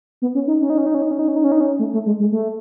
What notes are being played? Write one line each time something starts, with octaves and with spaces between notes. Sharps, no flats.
B3
C#4
D#4
C#4
D#4
C#4
D#4
C#4
D#4
C#4
D#4
C#4
D#4
C#4
D#4
C#4
A3
A3
G#3
G#3
A3